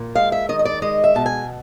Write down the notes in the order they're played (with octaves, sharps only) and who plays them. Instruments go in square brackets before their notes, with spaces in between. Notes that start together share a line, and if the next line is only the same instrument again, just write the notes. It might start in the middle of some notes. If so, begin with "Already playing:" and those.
Already playing: [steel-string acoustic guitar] A#2
G#3 F5
E5
D#3 D#5
D#5
D5
G#3 D#5
E5
B2 A5
G#5